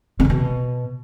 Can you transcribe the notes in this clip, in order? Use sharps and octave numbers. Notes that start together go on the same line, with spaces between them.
B2
G#2
B2